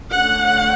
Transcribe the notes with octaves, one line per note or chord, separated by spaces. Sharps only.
D3 A3 C#4 F#5